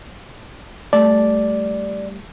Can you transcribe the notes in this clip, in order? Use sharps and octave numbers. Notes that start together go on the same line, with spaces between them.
G3 A3 D5 A5